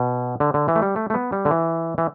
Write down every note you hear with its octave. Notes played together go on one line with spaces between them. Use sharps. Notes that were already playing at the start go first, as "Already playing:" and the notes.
Already playing: B2
D3
D3
E3
A3
G3
A3
A3
B3
G3
D3
E3
E3